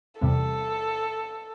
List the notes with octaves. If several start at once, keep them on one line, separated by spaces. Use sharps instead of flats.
E2 C3 G3 A4